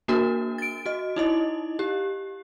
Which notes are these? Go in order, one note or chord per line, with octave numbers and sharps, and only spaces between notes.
A#3 D4 F#4 A#4
A6 D7
F#4 D#5
D#4 E4 D#5
G4